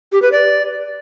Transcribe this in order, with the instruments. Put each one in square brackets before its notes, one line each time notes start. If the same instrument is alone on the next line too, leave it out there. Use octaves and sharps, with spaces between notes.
[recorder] G4
B4
D5